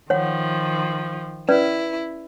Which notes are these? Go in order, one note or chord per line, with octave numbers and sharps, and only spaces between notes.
D#3 F3 C#5 F#5
C#4 E4 B4 D5